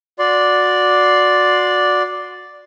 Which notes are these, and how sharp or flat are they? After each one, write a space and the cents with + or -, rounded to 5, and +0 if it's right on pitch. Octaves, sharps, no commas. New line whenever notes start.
F#4 -20 D5 +0 C6 +0